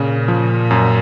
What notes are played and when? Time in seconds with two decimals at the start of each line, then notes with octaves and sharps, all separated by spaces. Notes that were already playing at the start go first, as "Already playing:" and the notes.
Already playing: A#2 C#3
0.28 F3
0.71 F#2